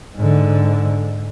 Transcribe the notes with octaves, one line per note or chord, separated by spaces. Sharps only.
G#2 D3